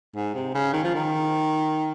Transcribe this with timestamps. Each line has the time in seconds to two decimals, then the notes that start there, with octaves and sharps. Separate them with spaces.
0.16 G#2
0.34 C3
0.54 C#3
0.73 D#3
0.84 F3
0.95 D#3